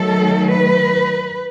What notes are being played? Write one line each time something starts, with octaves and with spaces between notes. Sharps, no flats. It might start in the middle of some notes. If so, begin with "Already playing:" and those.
Already playing: D#3 F#3 A3 A4
B4